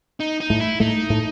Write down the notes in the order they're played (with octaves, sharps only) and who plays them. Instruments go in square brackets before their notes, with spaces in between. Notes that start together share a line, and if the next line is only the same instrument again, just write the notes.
[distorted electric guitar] D#4
D#4
[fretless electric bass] A2 A3
[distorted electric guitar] E4
[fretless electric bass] A2 A3 [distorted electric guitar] D#4
[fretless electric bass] A2 A3